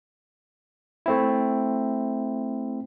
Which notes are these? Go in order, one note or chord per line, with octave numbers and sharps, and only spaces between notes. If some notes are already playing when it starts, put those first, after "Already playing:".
A3 C4 E4